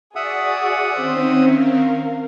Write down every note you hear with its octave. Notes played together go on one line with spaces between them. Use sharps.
F#4 G#4 D5 E5 F#5 D#6
D#3 C4 C#4 C5
A#4 F5